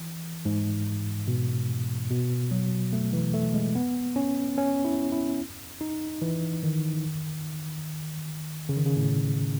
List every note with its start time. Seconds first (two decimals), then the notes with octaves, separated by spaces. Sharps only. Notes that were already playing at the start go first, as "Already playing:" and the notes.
Already playing: E3
0.45 G#2
1.28 B2
2.10 B2
2.51 F#3
2.93 A3
3.13 E3
3.34 A3
3.54 G#3
3.75 B3
4.16 C#4
4.58 C#4
4.85 E4
5.12 E4
5.81 D#4
6.22 E3
6.63 D#3
8.69 C#3
8.77 D#3
8.85 C#3
8.97 A2